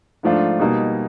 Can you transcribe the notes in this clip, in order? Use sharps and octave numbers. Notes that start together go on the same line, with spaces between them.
G#2 F3 A3 D4 F4
B2 G3 A#3 D#4